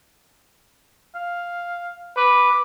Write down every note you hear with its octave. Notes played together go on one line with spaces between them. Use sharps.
F5
B4 D6